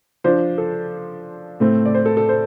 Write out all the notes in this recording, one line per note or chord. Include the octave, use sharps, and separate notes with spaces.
F3 D4 C5
A4
A2 A3 C4
D5
C5
A4
A4
C5